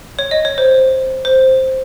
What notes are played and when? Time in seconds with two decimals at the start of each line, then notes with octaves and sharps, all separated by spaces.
0.19 C#5
0.31 D#5
0.45 C#5
0.58 C5
1.25 C5